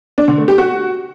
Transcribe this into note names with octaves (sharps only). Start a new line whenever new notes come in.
D4
D3
A3
G4
F#4